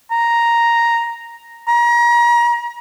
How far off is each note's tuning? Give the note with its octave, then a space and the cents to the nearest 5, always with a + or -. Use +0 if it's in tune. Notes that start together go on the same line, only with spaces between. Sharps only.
A#5 +0
A#5 +35